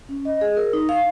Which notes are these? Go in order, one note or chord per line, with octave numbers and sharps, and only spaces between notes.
C#4
D#5
G#4
A#4
D#4
F5